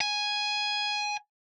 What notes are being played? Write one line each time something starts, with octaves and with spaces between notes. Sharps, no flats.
G#5